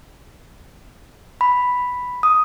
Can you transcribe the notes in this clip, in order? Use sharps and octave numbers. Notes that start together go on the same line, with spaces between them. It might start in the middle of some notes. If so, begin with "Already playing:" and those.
B5
D#6